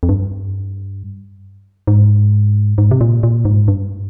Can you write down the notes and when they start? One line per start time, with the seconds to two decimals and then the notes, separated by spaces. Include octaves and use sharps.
0.03 F2
0.09 G2
1.87 G#2
2.78 G#2
2.91 C3
3.01 A#2
3.23 A#2
3.45 G#2
3.68 G2